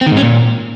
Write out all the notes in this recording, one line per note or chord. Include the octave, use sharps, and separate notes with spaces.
C4
D#3
G#2
C#4
A#2